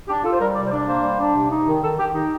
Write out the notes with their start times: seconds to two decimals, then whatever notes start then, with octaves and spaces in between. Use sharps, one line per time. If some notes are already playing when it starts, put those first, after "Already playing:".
0.08 D4 G4
0.24 F4 A4
0.32 C5
0.41 G3 A#4
0.56 C3 D5
0.68 C5
0.71 D4 D5
0.88 A#3 C5
1.03 G3
1.20 D4
1.36 C3
1.52 D#4
1.67 D#3
1.82 D#3 A4
1.99 D#3 G4
2.15 D#4 G4